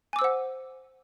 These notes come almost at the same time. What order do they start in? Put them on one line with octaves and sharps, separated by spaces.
G#5 D6 E6 C5 F#5